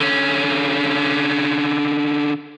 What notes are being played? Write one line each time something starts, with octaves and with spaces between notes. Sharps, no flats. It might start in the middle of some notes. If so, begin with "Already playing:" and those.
D3 C#4